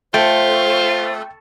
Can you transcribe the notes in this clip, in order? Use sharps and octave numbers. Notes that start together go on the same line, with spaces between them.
A3 F4 C5 G5